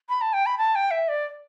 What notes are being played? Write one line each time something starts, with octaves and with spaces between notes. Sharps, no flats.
B5
A5
G5
B5
A5
G5
E5
D5